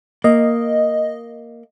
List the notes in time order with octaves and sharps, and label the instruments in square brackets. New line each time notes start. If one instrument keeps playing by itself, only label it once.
[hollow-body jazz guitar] A#3 [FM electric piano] D#5